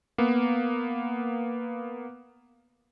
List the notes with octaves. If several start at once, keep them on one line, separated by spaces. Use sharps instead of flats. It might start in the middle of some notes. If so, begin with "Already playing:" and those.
A#3 B3